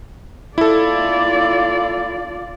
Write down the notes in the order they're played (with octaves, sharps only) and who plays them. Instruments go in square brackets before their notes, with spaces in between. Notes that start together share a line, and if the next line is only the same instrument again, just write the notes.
[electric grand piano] E4 A4 [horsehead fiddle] F4 D5